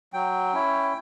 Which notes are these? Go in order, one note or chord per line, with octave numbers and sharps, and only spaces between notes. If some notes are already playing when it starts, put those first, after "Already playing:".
F#3 G5
C#4 E4